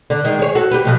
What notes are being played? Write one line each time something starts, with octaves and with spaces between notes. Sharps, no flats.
D3
D#3 G#3
G#4 C#5
F#4 A4
G4 B4
B2 F3 F#3